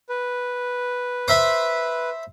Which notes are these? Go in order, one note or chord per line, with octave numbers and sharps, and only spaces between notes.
B4
C5 E5 B5